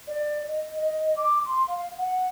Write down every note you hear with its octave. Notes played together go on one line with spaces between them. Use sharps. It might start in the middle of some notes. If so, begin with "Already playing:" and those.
D5
D#5
D#5
D6
C6
F5
F#5